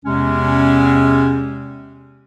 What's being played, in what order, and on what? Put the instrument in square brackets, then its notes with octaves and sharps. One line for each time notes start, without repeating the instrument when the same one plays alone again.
[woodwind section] E2 C3 G#3 C#4